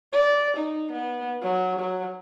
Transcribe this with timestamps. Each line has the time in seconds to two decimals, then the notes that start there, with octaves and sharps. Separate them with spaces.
0.13 D5
0.57 D#4
0.92 B3
1.42 F#3
1.80 F#3